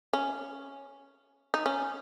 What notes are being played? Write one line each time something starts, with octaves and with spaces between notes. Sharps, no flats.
C#4
D#4
C#4